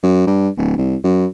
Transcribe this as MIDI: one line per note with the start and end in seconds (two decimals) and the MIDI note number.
0.03 0.26 42
0.27 0.49 43
0.57 0.76 26
0.78 0.96 36
1.04 1.26 42